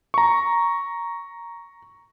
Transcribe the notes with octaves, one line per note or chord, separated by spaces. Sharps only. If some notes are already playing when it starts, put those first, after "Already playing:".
A#5 C#6